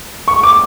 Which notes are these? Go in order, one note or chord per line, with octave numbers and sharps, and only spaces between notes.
C#6
D6